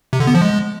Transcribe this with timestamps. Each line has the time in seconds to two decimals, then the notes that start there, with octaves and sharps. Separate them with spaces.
0.13 C3
0.20 D3
0.27 B3
0.34 F3
0.42 G#3